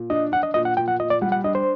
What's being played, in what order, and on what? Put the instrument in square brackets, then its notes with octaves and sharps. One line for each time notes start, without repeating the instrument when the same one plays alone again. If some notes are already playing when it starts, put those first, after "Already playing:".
Already playing: [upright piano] A#2
[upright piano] D4 [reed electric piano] D#5
[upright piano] D4 [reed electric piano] F#5
[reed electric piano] D#5
[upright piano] A#2 [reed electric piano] D#5
[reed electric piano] F#5
[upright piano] A#2 [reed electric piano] G5
[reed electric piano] F#5
[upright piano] A#2 [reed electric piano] D#5
[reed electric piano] D5
[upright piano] G3 [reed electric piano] F#5
[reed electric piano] F#5
[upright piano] D4 [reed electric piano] D#5
[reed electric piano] C5